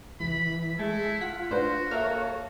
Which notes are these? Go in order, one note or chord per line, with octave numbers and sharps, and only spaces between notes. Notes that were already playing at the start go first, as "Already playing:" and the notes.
C#2 E3 B5
G#3 A3 E4
F4 F#5 B6
A2 D4 F#4 B4 C5
A#3 A4 C#5 E5 F5 F6